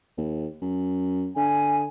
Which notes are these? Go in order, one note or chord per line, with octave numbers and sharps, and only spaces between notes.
D#2
F#2
D3 G#5